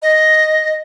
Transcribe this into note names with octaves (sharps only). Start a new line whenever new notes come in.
D#5